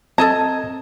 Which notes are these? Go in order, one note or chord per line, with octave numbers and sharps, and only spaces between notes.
C4 A4 D#5 A5 A#5 G#6